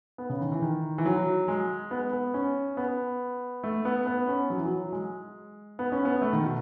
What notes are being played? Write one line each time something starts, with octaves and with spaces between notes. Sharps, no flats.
B3
C#3
D#3
E3
D#3
E3
F#3
G#3
B3
B3
C#4
B3
A3
B3
B3
C#4
F#3
E3
F#3
G#3
B3
C#4
B3
A3
D#3
B2